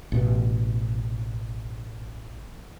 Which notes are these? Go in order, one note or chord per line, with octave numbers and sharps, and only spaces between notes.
A1 B2